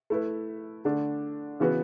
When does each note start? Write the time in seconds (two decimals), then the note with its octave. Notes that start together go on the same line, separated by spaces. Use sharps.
0.10 A3 E4 B4
0.85 D3 A3 D4
1.60 C#3 E3 B3 F#4 B4